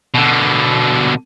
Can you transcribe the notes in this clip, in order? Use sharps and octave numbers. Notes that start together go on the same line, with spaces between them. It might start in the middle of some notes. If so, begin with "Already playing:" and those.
B2 D3